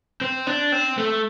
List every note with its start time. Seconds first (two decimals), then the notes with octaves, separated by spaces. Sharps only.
0.21 C4
0.47 D4
0.72 C4
0.98 A3